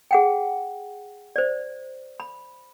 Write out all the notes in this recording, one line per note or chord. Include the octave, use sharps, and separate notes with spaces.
G#4 F#5 G5
C5 D5
B5